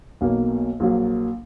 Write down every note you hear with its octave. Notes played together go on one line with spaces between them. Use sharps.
B1 B2 A#3
A#1 A#2 F#3 A#3